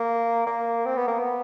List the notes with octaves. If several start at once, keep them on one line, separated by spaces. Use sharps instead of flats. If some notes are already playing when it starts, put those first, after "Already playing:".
Already playing: A#3
A#3
C4
B3
A#3
B3